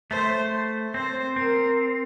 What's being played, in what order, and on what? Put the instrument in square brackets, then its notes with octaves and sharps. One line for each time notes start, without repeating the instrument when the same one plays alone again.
[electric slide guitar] A3 [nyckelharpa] C5
[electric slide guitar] C4 [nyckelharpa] C5
[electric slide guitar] C4 [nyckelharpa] A#4